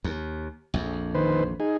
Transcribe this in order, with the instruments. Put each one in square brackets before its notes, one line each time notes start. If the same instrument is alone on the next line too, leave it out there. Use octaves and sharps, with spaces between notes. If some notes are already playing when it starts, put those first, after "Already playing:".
[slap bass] D#2
A#1 F2
[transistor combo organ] D#3 B4 C5
D#4 G#4